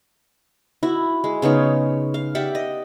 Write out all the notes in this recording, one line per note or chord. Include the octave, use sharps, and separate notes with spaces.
E4 F#4
G#3
C#3 B3 D#4 C#5
F5
G4 D5 E5 F#5
D#5